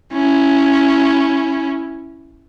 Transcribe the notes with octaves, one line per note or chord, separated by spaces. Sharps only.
C#4 E4